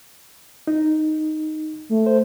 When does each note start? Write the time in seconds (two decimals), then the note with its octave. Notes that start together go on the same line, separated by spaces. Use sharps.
0.67 D#4
1.89 A3
2.06 C5